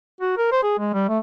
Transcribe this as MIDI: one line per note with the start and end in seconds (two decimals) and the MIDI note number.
0.21 0.33 66
0.38 0.49 70
0.52 0.60 72
0.63 0.78 68
0.79 0.92 56
0.93 1.08 55
1.09 1.19 57